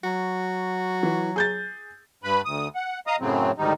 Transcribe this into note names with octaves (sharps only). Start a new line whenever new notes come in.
F#3 F#4
E3
G#4 G6 A6
G2 B4 B5
D2 D#6
F#5
D#5 F5 A#5 D#6
F#2 A2 C#3 F#3 C4
D2 G#2 D#3 G3 D#4